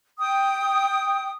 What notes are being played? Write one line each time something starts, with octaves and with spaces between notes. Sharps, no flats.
G5 D#6